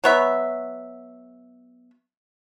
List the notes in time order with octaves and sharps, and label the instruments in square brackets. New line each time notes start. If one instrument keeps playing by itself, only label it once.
[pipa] F#3 B3 E5